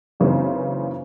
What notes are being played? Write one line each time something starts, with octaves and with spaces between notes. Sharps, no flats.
F#2 C#3 E3 A#3 C4 D#4